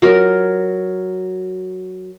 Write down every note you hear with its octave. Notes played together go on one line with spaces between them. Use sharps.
F#3 A#4